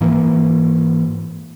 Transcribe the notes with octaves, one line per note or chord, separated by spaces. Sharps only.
G#2 E3 A#3